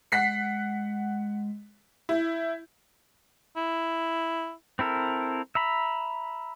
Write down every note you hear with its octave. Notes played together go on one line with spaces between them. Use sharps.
G#3 F#5 B6 C7
E4 G6
E4
C4 E4 A4 A#4
E5 A#5 B5